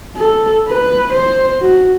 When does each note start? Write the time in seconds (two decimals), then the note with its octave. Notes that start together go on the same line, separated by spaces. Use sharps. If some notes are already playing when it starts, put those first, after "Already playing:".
0.16 A4
0.68 B4
1.13 C5
1.61 F#4